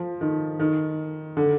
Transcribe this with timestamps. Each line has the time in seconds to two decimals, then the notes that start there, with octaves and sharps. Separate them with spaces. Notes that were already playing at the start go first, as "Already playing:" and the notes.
Already playing: F3
0.21 D#3
0.60 D#3
1.37 D3